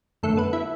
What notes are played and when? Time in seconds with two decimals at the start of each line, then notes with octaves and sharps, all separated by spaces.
0.23 F#2 D3 A3 A4
0.37 B3 B4
0.53 E4 E5